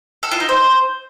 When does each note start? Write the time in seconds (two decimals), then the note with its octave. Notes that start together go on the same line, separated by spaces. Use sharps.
0.23 A4
0.31 F4
0.40 D#4
0.49 C5